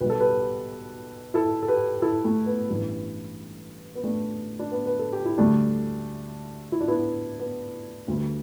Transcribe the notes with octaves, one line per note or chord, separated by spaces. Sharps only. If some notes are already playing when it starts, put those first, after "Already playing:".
B1 B2 G3 B4
A4
G4 B4
E4 A4
A4
G4 B4
E4 A4
A3
B3
A1 G2 E3 G3
B3
A3 D4
D4
B3
B4
A4
G4
E4
D2 D3 G3 A3 D4
E4
D4
B3 E4
B3
D2 D3 G3